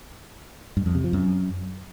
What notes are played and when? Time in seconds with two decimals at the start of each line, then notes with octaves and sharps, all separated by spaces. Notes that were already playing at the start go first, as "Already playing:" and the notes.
0.77 G2
0.86 F2
0.95 C3
1.04 F3
1.13 F#2